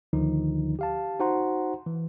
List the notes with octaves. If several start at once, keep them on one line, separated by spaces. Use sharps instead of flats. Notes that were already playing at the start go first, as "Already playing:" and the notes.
D2 D3 D#3 F3 D#4
G4 F5 A5
D#4 F#4 C5 F#5 A#5 C6
E3